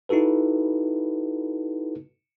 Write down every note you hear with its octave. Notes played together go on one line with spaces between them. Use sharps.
D#4 E4 F#4 A4 B4